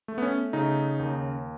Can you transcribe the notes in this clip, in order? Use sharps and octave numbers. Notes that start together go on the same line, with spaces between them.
A3
B3
C#4
C#3 D#4
D#2